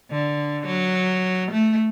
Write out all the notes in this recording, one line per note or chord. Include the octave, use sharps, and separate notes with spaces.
D3
F#3
A3